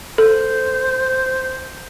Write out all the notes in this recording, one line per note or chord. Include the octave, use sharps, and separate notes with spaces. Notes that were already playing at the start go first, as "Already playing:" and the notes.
A4 C5